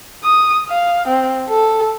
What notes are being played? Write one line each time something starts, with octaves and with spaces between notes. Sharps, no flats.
D#6
F5
C4
A4